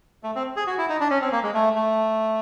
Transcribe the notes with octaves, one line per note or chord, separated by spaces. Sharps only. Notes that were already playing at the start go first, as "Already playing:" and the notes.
A3
C4
G#4
F#4
E4
D#4
D4
C#4
C4
A#3
G#3
A3
A3